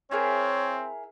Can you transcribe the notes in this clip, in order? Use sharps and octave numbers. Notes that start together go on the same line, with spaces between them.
C4 E4 G#4 A#4 C#5